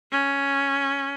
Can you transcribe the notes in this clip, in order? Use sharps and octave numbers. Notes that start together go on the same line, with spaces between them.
C#4